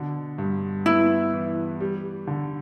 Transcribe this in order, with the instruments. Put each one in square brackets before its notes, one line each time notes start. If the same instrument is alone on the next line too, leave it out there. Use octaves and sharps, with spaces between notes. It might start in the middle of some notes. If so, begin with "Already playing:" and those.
Already playing: [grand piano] B2 D3
G2
[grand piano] B3 [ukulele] E4
[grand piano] E3
G3
D3